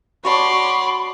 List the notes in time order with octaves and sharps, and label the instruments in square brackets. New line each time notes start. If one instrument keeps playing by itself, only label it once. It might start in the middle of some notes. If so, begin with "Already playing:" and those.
[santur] F#4 D5 A5 [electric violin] C#5 [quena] B5 [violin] C6 D6